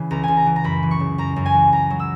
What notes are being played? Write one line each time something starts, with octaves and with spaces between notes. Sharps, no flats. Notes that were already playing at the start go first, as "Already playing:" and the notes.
Already playing: C#3 E3
C#2 A#5
C#2 G#5
A#5
E3
A#5
F#2 B5
E3
C#6
C#3
F#2 A#5
F#2
G#5
E3
F#2 A#5
F#3
E6